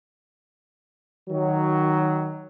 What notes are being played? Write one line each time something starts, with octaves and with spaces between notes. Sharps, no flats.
D#3 F#3